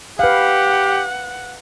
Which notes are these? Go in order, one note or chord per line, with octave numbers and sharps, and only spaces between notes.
G4 B4 F5 F#5